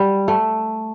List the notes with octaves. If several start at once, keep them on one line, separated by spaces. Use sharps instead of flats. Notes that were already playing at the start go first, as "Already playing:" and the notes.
Already playing: G3
A3